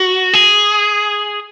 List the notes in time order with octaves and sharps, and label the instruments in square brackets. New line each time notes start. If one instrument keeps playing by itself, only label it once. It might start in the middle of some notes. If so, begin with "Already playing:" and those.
Already playing: [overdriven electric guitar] F#4
G#4